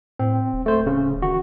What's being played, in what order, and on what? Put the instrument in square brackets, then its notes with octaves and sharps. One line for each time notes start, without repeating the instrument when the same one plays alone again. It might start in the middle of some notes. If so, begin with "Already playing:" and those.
[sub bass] A2 [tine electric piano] C4
[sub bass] D1
[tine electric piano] A3 C5
C#3
[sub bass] D#3 [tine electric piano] F#4